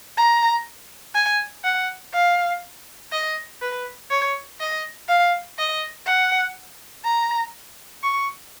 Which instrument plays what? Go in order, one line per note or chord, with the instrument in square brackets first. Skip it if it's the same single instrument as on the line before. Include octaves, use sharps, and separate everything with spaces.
[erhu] A#5
G#5
F#5
F5
D#5
B4
C#5
D#5
F5
D#5
F#5
A#5
C#6